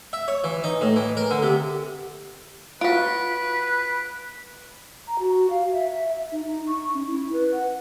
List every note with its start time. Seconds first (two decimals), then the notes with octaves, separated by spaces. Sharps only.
0.13 E5
0.28 C#5
0.44 E3
0.64 D#4
0.81 A2
0.96 E3
1.17 A#4
1.30 D3
1.42 C3
2.81 F4 F#4 B4 B6 D7
5.08 A#5
5.20 F#4
5.50 F5
5.72 E5
6.09 E5
6.32 D#4
6.44 D#4
6.67 C#6
6.94 C#4
7.07 E4
7.33 B4
7.53 F#5